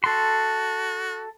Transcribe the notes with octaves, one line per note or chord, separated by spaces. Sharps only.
F#4 A4 C6